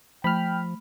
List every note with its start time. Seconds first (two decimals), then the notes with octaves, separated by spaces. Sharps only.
0.24 F3 A3 G5 B5 F6